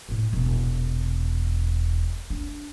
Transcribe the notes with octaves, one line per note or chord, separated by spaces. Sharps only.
A2 C4
E1 A#2
D4